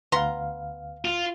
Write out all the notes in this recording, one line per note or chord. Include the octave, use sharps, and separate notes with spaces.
D2 B3 F5 A#5 C6
F4